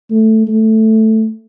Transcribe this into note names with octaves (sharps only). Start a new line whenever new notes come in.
A3
A3